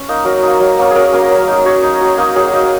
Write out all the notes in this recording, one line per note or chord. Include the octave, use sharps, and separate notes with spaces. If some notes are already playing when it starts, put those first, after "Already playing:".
Already playing: C#4
A#3 D#4
F#3 A#4
A#3 D#4
F#3
A#3 C#4
F#3 G#4 A#4
A#3 C#4
F#3
D#4
F#3 C#5
D#4
F#3
A#3 D#4
F#3 G#4
A#3 D#4